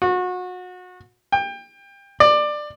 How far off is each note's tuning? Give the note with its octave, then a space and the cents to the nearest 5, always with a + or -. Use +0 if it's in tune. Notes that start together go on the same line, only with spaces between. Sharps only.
F#4 -30
G5 +25
D5 +20